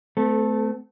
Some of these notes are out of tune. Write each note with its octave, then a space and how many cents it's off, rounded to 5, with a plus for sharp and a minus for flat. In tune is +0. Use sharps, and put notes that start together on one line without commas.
A3 -20 C4 -45 A4 +0